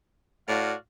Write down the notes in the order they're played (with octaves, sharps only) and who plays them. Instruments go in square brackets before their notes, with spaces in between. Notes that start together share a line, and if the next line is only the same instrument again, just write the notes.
[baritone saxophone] A2 [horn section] F#4 D5 F5